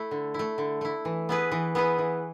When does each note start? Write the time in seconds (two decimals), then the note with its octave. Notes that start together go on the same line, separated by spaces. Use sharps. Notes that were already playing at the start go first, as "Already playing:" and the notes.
Already playing: A3 E4
0.11 D3
0.34 A3 E4
0.58 D3
0.81 A3 E4
1.05 E3
1.29 B3 E4 G#4 B4
1.51 E3
1.75 B3 E4 G#4 B4
1.98 E3